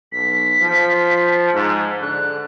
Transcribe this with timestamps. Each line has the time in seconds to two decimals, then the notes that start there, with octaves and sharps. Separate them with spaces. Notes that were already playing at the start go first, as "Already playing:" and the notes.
0.12 B1 B6
0.61 F3
1.54 G#2
2.01 D3 F#6